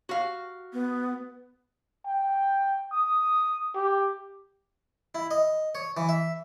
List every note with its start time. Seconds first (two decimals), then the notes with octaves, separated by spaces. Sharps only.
0.09 F#4 F5
0.73 B3
2.07 G5
2.93 D#6
3.75 G4
5.15 E4
5.31 D#5
5.75 C#5
5.97 E3
6.09 E5